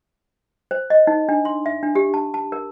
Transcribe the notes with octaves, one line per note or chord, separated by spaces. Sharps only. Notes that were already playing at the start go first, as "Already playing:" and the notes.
C5
D#5
D#4
D4
C6
E5
D4
G4
A5
A5
A#4